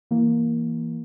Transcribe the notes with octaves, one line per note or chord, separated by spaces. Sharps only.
E3 A#3